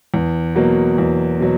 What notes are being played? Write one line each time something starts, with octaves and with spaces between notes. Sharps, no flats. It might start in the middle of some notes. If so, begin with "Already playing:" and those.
E2
B2 F#3 A#3
E2
B2 F#3